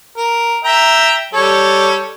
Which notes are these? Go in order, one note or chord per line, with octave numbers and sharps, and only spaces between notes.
A#4
E5 G5 A#5
G3 A4 C#5